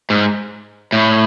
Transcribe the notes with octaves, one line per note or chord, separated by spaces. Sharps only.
G#2
A2